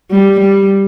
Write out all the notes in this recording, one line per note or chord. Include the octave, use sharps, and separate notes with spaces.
G3
G3